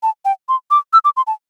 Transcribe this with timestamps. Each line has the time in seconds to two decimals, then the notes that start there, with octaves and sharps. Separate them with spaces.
0.03 A5
0.25 G5
0.49 C6
0.71 D6
0.93 E6
1.05 D6
1.17 C6
1.27 A5